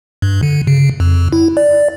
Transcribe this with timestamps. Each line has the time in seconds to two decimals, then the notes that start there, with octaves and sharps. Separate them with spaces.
0.22 G2
0.43 D3
0.67 C#3
1.00 F2
1.33 E4
1.57 D5